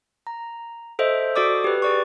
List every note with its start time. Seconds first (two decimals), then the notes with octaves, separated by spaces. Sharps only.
0.27 A#5
0.99 A4 C5 D#5 E5
1.35 F#4 A4 D5 D6 D#6
1.64 G4 B4
1.82 G#4 D5 C#6